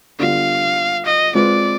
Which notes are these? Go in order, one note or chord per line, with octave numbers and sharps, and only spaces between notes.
D3 G3 B3 F4 F5
D#5
G#3 C4 F4 B4 D5